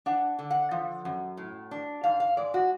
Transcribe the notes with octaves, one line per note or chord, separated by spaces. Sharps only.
D4 F#5
D3
F#5
F3
F#2
A2
D4
G#2 F5
F5
G#3 D5
F#4